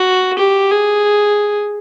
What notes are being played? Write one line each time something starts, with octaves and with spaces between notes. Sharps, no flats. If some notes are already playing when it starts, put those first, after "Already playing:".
Already playing: F#4
G4
G#4